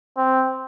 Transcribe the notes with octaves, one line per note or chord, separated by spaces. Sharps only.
C4